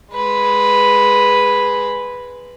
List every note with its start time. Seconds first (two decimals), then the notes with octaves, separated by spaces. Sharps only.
0.13 G#3 B4